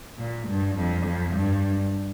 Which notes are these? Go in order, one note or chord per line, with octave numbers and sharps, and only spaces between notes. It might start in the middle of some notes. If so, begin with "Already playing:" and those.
A#2
G2
F2
F2
G2